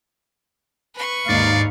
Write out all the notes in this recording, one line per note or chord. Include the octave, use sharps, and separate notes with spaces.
B4 C#6
D#2 G#2 D#4 D5 F5